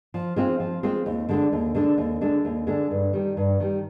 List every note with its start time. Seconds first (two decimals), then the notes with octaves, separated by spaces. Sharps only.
0.14 F3
0.36 G#3 C4 F4
0.60 F3
0.83 G#3 C4 F4
1.06 D#2
1.29 D3 G#3 D4
1.52 D#2
1.75 D3 G#3 D4
1.98 D#2
2.21 D3 G#3 D4
2.45 D#2
2.67 D3 G#3 D4
2.91 G2
3.13 D#3 G3
3.37 G2
3.60 D#3 G3